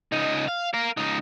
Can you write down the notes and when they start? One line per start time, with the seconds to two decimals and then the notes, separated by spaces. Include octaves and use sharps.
0.13 C#2 D#4
0.49 F5
0.74 A#4 F5
0.97 C#2 D#4